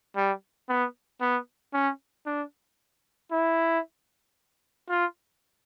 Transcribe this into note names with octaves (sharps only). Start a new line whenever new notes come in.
G3
B3
B3
C#4
D4
E4
F4